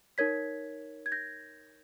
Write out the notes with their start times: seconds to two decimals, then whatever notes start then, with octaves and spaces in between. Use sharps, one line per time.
0.18 D#4 A#4 C#5 G#6 B6
1.06 G#6
1.12 G6 A#6